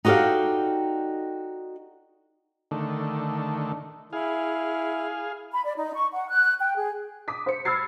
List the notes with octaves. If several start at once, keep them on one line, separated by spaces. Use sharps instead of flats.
D#4 F#4 G4 A4 D5 F5
D3 D#3 A3
E4 G#4 F5
B5
D5
D#4
C#6
F#5
F#6
G5
G#4
D6 D#6 B6
C5 C#7
B5 E6 F6 G#6 A6 C7